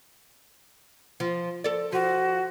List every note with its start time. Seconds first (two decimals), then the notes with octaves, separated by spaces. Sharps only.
1.20 F3
1.64 A4 D5
1.92 F3 F#4